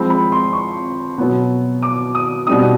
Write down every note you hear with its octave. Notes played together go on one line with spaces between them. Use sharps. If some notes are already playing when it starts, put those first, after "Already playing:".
Already playing: F3 G#3 C4 B5
B5
C6
C#6
B2 F#3 B3
D6
D#6
B2 G3 C4 D#4 D#6